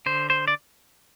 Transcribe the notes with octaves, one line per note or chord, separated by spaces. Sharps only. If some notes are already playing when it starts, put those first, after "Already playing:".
D3 C5
C5
D5